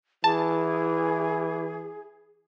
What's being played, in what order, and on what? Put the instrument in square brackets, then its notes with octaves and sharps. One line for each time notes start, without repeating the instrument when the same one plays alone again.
[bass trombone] E3 [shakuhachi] G#4 [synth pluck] A5